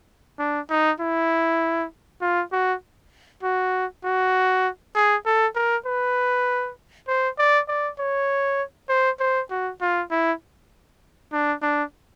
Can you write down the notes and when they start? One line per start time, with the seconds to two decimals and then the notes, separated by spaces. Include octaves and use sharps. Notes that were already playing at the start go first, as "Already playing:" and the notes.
0.39 D4
0.70 D#4
1.00 E4
2.21 F4
2.53 F#4
3.43 F#4
4.04 F#4
4.95 G#4
5.26 A4
5.55 A#4
5.86 B4
7.08 C5
7.38 D5
7.68 D5
7.99 C#5
8.89 C5
9.20 C5
9.50 F#4
9.81 F4
10.11 E4
11.33 D4
11.62 D4